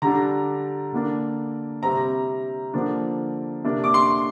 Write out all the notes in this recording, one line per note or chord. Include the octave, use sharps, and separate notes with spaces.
D3 G3 D4 A#5
D3 A#3 D4
C3 G3 C4 A#5
D3 F3 A#3 D4
C3 A#3 D4
D6
C6